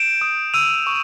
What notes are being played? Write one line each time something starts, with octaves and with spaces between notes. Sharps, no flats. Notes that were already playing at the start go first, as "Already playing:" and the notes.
Already playing: G6 D7 E7
D#6
E6 D#7 F7
C#6